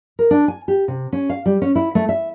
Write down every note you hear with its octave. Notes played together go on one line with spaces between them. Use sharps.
A#4
D4
G#5
G4
C3
C#4
F5
G3
C#4
E4
A3
E5